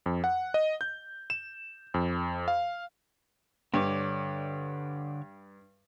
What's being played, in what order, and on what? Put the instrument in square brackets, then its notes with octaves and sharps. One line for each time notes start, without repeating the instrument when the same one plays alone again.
[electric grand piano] F2
F#5
D#5
G6
E7
F2
F5
[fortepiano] G2 [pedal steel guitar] D3 C#5 D6